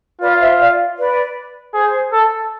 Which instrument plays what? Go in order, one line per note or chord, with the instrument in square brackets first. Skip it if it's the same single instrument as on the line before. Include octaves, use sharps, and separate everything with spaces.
[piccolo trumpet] F4 [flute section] B4 D5
[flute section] F5
C5 E5
D5 F5
B4 D5
[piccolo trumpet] G#4 [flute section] C5
[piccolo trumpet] A4